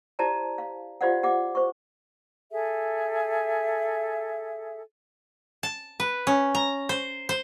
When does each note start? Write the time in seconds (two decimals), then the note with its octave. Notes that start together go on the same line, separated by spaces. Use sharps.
0.19 E4 G4 C5 D5 A5 A#5
0.58 F5
1.01 F4 G4 C5 D5 F5 F#5
1.23 G4 F#5 D6
1.55 C5 C#6
2.51 G#4 A4 E5
5.63 A5
6.00 B4
6.27 C#4
6.55 A#5
6.89 C5
7.29 C5